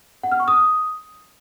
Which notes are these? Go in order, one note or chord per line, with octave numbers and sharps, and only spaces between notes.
F#5
F6
C#6
D#6